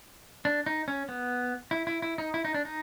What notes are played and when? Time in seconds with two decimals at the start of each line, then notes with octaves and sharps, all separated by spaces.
0.45 D4
0.66 D#4
0.88 C#4
1.09 B3
1.71 E4
1.87 E4
2.02 E4
2.18 D#4
2.34 E4
2.45 D#4
2.54 D4
2.65 D#4